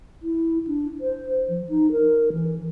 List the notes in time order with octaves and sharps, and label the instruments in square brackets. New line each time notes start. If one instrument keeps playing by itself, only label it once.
[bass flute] E4
D4
C5
F3
D#4
A#4
E3